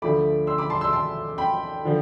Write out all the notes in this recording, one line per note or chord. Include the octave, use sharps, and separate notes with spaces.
D2 D3 F3 A3 B5 D6
C6 E6
B5 D6
A5 C6
C6 E6
A5 C6
G5 B5
D3 F3